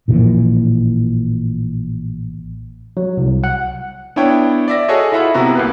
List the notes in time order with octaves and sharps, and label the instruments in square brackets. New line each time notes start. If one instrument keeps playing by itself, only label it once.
[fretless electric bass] A1 A#2 E3 F3
[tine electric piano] F#3
C2
F#5
[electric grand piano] B3 D4 E4 C#5 G5
D5 E5 A#6
F#4 G#4 A4 C#5 D#5
E4 F4 E5 F#5 B5
C3 B3 E4 F#4 A#5
C2 A#3 B4